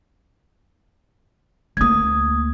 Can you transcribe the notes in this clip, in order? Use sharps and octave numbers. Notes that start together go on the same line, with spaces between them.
D2 A#3 D#6 G#6